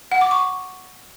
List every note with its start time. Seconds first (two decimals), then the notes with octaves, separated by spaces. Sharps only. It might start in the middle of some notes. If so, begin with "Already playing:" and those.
0.12 F#5
0.21 D6
0.31 C#6